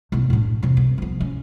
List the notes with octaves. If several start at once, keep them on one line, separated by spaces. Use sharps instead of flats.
B1 E4
A2 D4
E2 C3
C2
F3 B3
C#4